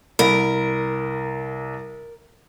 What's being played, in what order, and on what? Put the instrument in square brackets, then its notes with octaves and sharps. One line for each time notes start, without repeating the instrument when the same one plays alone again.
[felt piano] C2 B5 [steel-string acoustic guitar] A#4